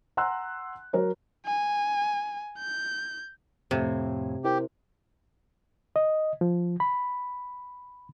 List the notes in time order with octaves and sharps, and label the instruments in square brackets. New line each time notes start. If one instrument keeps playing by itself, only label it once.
[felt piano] F#5 G#5 A#5 C6 E6 F#6
F#3 A#4 C#5
[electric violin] G#5
G6
[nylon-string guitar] F2 A2 C4 [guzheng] C3
[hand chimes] E4 A#4 C5 [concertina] G4
[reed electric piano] D#5
F3
B5